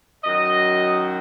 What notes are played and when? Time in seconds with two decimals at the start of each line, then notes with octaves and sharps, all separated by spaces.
0.24 F#2 D#3 F#3 D#5